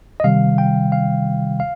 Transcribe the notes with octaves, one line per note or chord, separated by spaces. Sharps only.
D#5
C3 D#3 G3 F5
G5
F5
F5